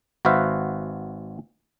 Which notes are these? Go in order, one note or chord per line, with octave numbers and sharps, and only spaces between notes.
G#1 F#4 B4 C5 E5 F5